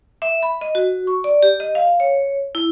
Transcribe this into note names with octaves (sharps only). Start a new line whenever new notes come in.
E5
B5
D#5
F#4
C#6
D5
G4
D#5
F5
C#5
E4